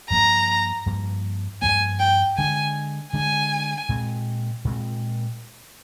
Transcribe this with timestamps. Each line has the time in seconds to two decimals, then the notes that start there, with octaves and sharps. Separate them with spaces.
0.10 G2 F3 A#3 A#5
0.86 G2 F3 A#3
1.62 G2 F3 A#3 G#5
2.00 G5
2.37 D3 G#3 D4 G#5
3.13 D3 G#3 D4 G#5
3.89 A#2 G#3 C4
4.65 A#2 G#3 C4